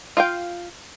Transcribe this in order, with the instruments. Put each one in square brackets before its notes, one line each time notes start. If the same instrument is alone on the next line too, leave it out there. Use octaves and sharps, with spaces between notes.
[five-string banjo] F4 F5 G5